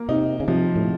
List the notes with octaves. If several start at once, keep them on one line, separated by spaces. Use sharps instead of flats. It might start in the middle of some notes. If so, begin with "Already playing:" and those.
Already playing: A#3
C3 D#4
C#3
C3 F3
A2